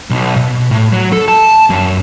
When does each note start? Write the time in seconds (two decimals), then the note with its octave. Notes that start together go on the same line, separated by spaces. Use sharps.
0.10 B1
0.36 B2
0.71 A2
0.93 F#3
1.12 A4
1.28 A5
1.70 F#2